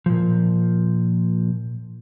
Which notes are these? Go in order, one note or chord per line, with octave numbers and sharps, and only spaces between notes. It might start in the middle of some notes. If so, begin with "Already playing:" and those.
A#2 F3